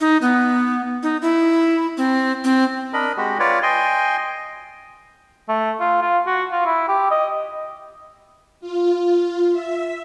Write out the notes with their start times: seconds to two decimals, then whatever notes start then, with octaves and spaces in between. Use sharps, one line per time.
0.01 D#4
0.22 B3
1.03 D#4
1.22 E4
1.97 C4
2.44 C4
2.93 D4 A#4 D#5 B5
3.17 G#3 F#4 G4
3.40 F4 B4 C#5 D5
3.63 D#5 G5 G#5 C6
5.49 A3
5.80 F4
6.02 F4
6.27 F#4
6.52 F4
6.65 E4
6.89 G4
7.11 D#5
8.61 F4
9.52 E5